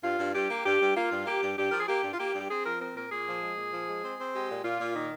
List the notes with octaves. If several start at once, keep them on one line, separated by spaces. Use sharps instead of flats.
G2 F4
G2
G2 G4
A#3
G2 G4
G2
A#3 F4
G2
A#3 G4
G2
G2 G4
F3 A#4
G#4
A#3 G4
G2
F4
A#3 G4
G2
G4
C4 G#4
F3 A#4
C4 A#4
A#2 A#4
A#2 G#4
F3
G#3
A#2
F3
G#3
C4
C4
G#3 G4
A#2
A#2 F4
A#2
D#3